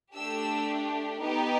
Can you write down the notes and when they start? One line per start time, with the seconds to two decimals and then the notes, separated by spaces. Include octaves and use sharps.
0.15 A3 D4 G4 E6
1.21 B3 D#4 G4